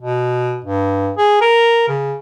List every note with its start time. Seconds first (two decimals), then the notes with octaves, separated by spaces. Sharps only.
0.01 B2
0.65 G2
1.17 G#4
1.41 A#4
1.88 C#3